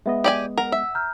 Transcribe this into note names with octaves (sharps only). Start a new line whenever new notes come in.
G#3 B3 D#5 E5
G4 D5 G#5
A#4 F#5
E5
A#5 F6 G6